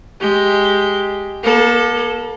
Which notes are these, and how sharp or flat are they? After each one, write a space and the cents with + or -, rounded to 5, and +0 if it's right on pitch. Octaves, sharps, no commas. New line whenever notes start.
G#3 +0 G4 +0
A#3 +35 A4 +0